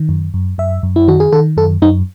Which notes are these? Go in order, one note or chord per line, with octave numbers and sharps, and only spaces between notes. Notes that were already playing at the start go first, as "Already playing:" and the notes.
Already playing: D#3
F#2
F#2
F#2 E5
F#2
E4
D#3 F#4
G#4
D#3 A4
F#2 A4
F#2 D#4